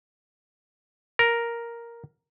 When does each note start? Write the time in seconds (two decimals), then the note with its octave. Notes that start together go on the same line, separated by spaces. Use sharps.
1.19 A#4